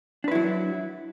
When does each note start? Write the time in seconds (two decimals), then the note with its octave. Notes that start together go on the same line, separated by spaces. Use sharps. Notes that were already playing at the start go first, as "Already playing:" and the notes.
0.24 D4
0.28 B4
0.32 E4
0.35 F#3